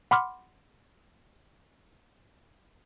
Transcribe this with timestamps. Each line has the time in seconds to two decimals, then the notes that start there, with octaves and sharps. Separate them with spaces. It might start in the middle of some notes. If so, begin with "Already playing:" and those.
0.11 F#5 B5 C6 D6 F6